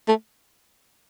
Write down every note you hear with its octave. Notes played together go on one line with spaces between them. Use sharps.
A3